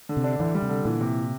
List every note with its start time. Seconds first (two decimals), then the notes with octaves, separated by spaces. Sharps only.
0.09 D3
0.17 C3
0.24 D4
0.39 D2 E3
0.55 G3
0.62 C3
0.69 D3
0.85 A#2 E3
1.01 C3